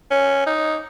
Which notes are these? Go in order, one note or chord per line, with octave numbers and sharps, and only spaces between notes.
C#4
D#4